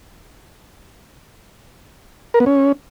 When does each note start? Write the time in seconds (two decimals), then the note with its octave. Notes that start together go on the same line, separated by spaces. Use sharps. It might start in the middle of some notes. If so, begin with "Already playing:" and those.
2.34 A#4
2.40 B3
2.46 C#4